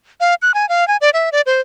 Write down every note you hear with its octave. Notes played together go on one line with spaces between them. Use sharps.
F5
F#6
G#5
F5
G#5
D5
E5
D5
C5